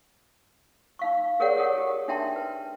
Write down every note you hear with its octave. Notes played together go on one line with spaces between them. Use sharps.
D#4 F5 C#6
G4 G#4 A#4 C#5 D5 F#5
G4 A4 A#4 C#5 F#5
G4
D4 D#4 E5 G5 A5 C6
B4